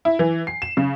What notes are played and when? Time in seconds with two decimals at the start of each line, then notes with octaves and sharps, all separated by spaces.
0.05 E4
0.19 E3
0.47 C7
0.62 E7
0.77 C#3